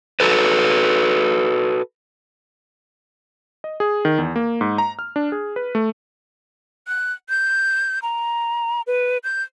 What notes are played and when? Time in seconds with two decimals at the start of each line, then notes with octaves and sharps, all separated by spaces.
0.20 F#4 A4 B4
3.64 D#5
3.80 G#4
4.05 D#3
4.18 E2
4.36 A#3
4.61 G#2
4.78 A#5
4.99 F6
5.16 D4
5.32 G#4
5.56 B4
5.75 A3
6.88 F#6
7.29 G6
8.03 A#5
8.87 B4
9.24 G6